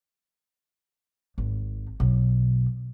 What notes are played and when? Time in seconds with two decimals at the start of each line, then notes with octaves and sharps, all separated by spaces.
1.38 G#1
2.00 B1